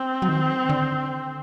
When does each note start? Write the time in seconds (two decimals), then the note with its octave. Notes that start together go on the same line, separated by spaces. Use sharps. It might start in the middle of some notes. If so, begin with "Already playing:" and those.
Already playing: C4
0.22 F#3
0.28 D#3
0.69 D3